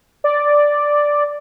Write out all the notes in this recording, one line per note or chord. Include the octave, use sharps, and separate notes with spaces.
D5